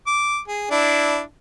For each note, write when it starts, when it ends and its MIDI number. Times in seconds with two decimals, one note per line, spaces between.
0.07 0.39 86
0.48 0.67 68
0.71 1.20 62
0.71 1.20 64